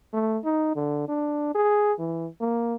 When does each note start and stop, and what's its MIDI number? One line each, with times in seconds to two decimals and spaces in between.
0.14 0.38 57
0.44 0.75 63
0.76 1.06 50
1.08 1.54 62
1.55 1.93 68
1.99 2.27 52
2.41 2.75 58